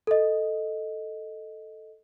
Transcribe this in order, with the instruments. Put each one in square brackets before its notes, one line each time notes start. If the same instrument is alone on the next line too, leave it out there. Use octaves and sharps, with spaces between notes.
[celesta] A4 D#5